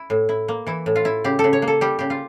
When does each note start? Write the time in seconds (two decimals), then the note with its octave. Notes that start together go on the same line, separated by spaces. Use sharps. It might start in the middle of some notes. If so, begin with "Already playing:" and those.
Already playing: E4
0.10 A2
0.29 E4
0.48 A#3
0.67 E3 E4
0.86 A2
0.96 F4
1.05 E4
1.24 C#3 G4
1.39 A4
1.44 C#3
1.53 C#5
1.62 A#3
1.68 A4
1.81 G3 G4
1.99 C#3 G4
2.10 F4